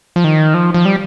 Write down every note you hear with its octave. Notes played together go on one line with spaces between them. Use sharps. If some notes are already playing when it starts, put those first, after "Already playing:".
F3
D#3
F3
F3
G3